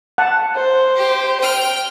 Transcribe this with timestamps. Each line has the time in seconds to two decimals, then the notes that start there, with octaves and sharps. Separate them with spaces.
0.18 F#5 A5
0.56 C5
0.96 G4
1.40 G5 F6